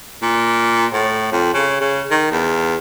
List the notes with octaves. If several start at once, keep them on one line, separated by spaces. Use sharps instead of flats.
A#2
A2
F2
C#3
C#3
D#3
E2